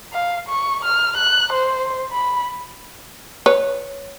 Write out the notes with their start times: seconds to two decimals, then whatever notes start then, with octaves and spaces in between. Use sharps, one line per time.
0.13 F5
0.48 C#6
0.84 F6
1.17 F#6
1.52 C5
2.12 B5
3.46 B4 C#5